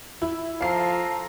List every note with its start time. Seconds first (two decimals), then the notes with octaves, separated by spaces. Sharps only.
0.22 E4
0.61 F3 A4 F5 A#5 C7